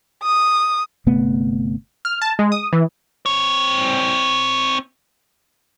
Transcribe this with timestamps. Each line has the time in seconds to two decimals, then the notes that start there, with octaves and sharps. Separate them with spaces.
0.23 D#6
1.06 G1 C3 A3 B3
2.05 F6
2.22 A5
2.39 G#3
2.52 D#6
2.73 E3
3.26 C4 C#5